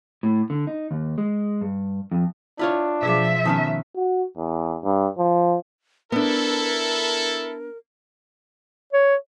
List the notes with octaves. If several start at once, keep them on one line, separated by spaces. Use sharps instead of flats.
A2
D3
D#4
D#2
G#3
G2
F2
D4 E4 F4 C#5
B2 F3 G#4 E5 D6
D#3 B3 C#4 G#5 A5 D#6
F#4
E2
G2
F3
B3 D4 E4 A4 A#4
C#5